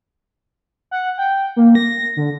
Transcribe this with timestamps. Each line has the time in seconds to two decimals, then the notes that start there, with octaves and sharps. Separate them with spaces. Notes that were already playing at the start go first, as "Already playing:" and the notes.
0.91 F#5
1.18 G5
1.56 A#3
1.75 A#6
2.17 D3